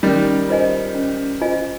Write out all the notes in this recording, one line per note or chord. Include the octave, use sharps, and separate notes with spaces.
D#3 G3 C#4
F4 C5 D#5 G#5
C#4
F4 C5 D#5 G#5